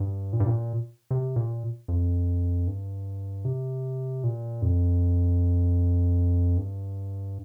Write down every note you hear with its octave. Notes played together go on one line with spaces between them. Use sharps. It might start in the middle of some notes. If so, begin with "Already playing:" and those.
Already playing: G2
A#2
G2
A#2
C3
A#2
F2
G2
C3
A#2
F2
G2